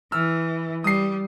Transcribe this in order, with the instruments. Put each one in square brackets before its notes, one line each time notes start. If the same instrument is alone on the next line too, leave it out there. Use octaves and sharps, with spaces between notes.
[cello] E3 [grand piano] E6 F6
[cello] G3 [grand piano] D#6 C7